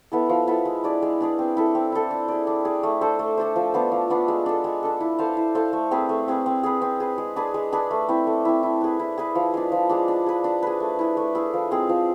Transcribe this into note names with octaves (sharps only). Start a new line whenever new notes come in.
B3 E4 A4
F3
B3 E4 A4
G#3
D4 G#4 D5
G#3
D4 G#4 D5
C4
E4 A4
C4
E4 A4
D4
G#4 D5
D4
G#4 D5
A3
D4 A4 C5
A3
D4 A4 C5
F3
B3 D4 F4
F3
B3 D4 F4
G#3
D4 A4
G#3
D4 A4
E4
A4 C5 F5
E4
A4 C5 F5
A3
C4 G#4 B4
A3
C4 G#4 B4
C4
G#4 B4
C4
G#4 B4
G#3
D4 G#4 B4
G#3
D4 G#4 B4
A3
C4 E4
A3
C4 E4
E4
G#4 B4
E4
G#4 B4
F3
G#3 D4
F3
G#3 D4
D4
G#4 B4
D4
G#4 B4
A3
E4 G#4
A3
E4 G#4
F3
G#3 C4 G#4
F3